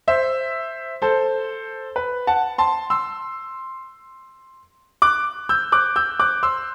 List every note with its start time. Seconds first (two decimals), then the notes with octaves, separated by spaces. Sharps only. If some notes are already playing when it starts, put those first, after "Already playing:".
0.08 C5 E5
1.02 A4 C5
1.96 B4
2.27 F#5 A5
2.58 A5 C6
2.90 C6 E6
5.02 D6 F#6
5.49 E6 G6
5.72 D6 F#6
5.96 E6 G6
6.20 D6 F#6
6.43 C6 E6